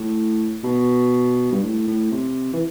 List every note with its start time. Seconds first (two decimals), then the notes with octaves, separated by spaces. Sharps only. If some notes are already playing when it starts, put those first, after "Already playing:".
Already playing: A2
0.64 B2
1.52 G2
1.63 A2
1.87 A2
2.12 C3
2.53 E3